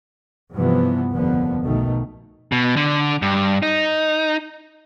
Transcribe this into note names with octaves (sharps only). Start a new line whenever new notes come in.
G2 C3 E3 F3 B3
F1 D#2 D3 F3 B3
B1 B2 D#3 A3
B2
D3
G2
D#4